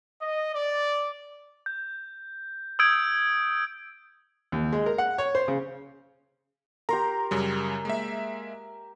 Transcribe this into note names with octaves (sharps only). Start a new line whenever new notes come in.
D#5
D5
G6
D#6 E6 G6 G#6 D7
D#2
G#3
A#4
F#5
C#5
C5
C#3
G4 A#4 A#5 C6
F#2 C#3 G3
G#3 A#3 E5